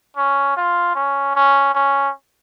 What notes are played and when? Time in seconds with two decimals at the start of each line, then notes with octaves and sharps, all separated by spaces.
0.16 C#4
0.57 F4
0.95 C#4
1.35 C#4
1.74 C#4